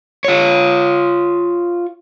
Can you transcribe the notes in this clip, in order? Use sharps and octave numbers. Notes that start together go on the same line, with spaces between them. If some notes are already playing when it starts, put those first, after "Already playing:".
F4 C#5